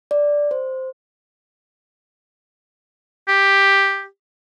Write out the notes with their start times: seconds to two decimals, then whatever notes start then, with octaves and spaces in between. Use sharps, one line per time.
0.11 D5
0.51 C5
3.28 G4